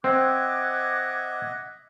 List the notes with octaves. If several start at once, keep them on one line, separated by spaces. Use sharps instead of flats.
C4 D#5 E5 F#5 D6 F#6 G#6